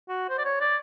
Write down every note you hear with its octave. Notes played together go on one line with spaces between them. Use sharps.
F#4
C5
D5
C#5
D5